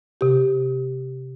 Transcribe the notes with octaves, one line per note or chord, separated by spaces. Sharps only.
C3 G4